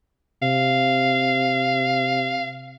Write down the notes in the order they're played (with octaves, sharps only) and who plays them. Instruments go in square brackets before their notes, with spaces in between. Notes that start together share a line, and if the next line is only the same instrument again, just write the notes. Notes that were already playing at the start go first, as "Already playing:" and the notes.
[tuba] C3 [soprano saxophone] F5